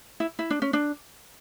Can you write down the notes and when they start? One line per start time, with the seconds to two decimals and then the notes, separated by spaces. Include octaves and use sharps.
0.20 E4
0.39 E4
0.50 D4
0.62 C#4
0.73 D4